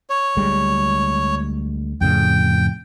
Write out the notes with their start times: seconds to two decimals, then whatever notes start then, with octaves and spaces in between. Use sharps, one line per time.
0.10 C#5
0.37 D2 G3 G#3
2.01 F2 A2 C#3 G5